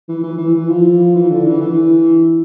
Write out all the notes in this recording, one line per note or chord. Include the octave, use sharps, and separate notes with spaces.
E3
E3
E3
E3
F3
E3
D3
E3
E3